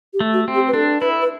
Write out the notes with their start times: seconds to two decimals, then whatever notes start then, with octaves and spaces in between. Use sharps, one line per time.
0.14 G4
0.20 A3
0.33 F#4
0.48 C4
0.55 G4
0.67 B4
0.73 D4 A4
1.00 E4 B4
1.22 B4